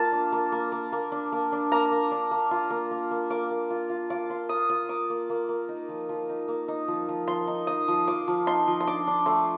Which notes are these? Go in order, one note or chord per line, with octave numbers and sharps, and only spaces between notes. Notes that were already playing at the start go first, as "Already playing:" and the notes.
Already playing: A#3 F4 A5
D4
A#3
A#3
A#3
A#3
D4
A#3
D4
A#3 A#5
A#3
D4
A#3
F4
A#3
A#3
A#3
A#3 D6
A#3
F4
F4
F4 D6
F4 C6
A#3 D#6
F4 D#6
A#3 D6
A#3
A#3
A#3
D#4
F3
F3
D#4
A#3
D#4
F3
F3
F3 C6
D#4
D#4 D#6
F3
F3 D6
F3
D#4 C6
F3
C6
D4 D6
D4
A3 C6